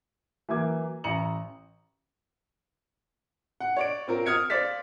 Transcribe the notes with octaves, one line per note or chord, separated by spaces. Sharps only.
E3 F#3 A#3 D6 G#6
A1 A#5 C#7 F#7
F#5
C#5 D5 D7
C4 F4 A#4
D#6 F6 G#6 C#7
C5 D5 F5 A6 B6